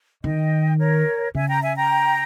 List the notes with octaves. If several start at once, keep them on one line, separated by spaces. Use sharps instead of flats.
D#3 D#5 G5
A#4 C#5
C#3 E5 G#5
G5 A#5
E5 G#5
G5 A#5